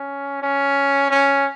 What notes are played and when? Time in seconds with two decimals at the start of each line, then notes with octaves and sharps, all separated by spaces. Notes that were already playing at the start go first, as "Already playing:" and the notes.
Already playing: C#4
0.42 C#4
1.10 C#4